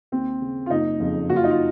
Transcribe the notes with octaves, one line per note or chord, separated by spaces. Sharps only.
D#2 C4
C#3
F4
F#1 D#4
F2 C#3
F#1 F#4
F4
D#4
F4